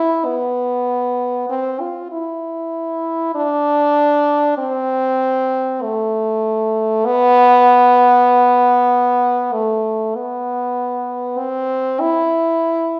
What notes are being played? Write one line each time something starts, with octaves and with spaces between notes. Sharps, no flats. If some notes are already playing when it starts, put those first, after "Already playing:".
Already playing: E4
B3
C4
F4
E4
D4
C4
A3
B3
A3
B3
C4
E4